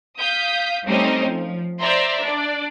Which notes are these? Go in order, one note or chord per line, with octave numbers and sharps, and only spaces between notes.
F5 D#6 G6 B6
G3 A3 C4 C#4 D#4 C5
F3
C5 D5 E5 A#5 C6
D4 D5